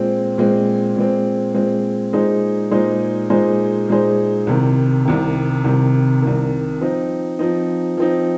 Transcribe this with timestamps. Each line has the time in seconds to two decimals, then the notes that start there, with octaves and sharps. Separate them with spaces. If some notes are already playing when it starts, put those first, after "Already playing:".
Already playing: A#2 G#3 C4
0.38 A#2 G#3 C4
0.96 A#2 G#3 C4
1.55 A#2 G#3 C4
2.13 A#2 G#3 D#4 G#4 C5
2.71 A#2 G#3 D#4 G#4 C5
3.30 A#2 G#3 D#4 G#4 C5
3.89 A#2 G#3 D#4 G#4 C5
4.47 C2 C3 D#3
5.05 C2 C3 D#3
5.64 C2 C3 D#3
6.22 C2 C3 D#3
6.80 F3 C4 D#4
7.39 F3 C4 D#4
7.97 F3 C4 D#4